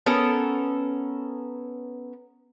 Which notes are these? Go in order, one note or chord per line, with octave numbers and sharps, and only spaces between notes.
B3 C#4 A4 A#4